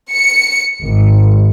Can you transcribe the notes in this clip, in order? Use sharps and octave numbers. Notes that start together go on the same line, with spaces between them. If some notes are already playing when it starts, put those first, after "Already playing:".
C#7
G#1